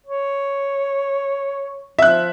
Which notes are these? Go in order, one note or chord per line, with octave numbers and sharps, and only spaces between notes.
C#5
F3 E5 F#6